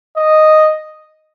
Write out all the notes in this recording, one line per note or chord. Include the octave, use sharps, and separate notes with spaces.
D#5